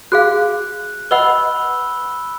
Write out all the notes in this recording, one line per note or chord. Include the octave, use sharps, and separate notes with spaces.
F#4 G#4 F5 F#6
B4 D#5 F#5 B5 E6 G7